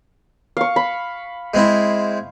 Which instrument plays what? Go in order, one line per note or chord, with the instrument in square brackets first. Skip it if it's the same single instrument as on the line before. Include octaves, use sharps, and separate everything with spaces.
[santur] F5 C#6
B5
[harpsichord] G#3 C4 E4